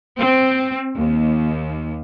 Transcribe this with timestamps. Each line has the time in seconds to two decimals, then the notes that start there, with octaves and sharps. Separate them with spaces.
0.18 C4
0.96 D#2